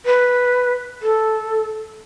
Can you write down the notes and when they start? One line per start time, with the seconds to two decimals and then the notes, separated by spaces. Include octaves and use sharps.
0.06 B4
1.02 A4